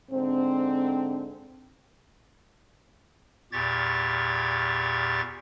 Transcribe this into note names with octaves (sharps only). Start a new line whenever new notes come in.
G#2 D3 C4
E2 A#2 G4 C#6 G#6 A6